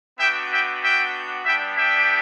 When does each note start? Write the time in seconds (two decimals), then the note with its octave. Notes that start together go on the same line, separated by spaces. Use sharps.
0.19 B3 D4 F#4 E5 G5
0.50 E5 G5
0.82 E5 G5
1.45 G3 B3 D4 G4 E5 G5
1.77 E5 G5